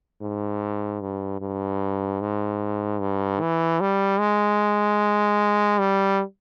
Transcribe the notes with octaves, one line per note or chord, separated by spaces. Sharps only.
G#2
G2
G2
G#2
G2
E3
G3
G#3
G3